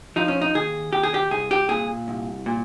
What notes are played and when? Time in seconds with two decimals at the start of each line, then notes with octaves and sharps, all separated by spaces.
0.16 F3 D#4
0.28 C#4
0.41 D#4
0.54 D#2 G#4
0.93 D#2 G4
1.03 G#4
1.14 G4
1.31 C2 G#4
1.51 G4
1.69 A#2 G#4
2.08 C2
2.46 A#2